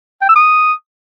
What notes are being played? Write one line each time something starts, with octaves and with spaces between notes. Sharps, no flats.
G5
E6
D#6